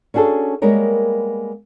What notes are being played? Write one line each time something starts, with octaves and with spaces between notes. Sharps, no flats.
C#4 D4 F#4 G#4 A4
G3 G#3 A#3 B3 A#4 C#5